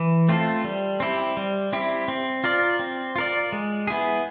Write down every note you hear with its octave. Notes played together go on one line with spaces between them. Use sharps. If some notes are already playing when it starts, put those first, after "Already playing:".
Already playing: E3
A3 C4 F4 A4
G3
C4 E4 G4
G3
C4 E4 G4
C4
F4 A#4 D5
C4
F4 A#4 D5
G#3
B3 E4 G#4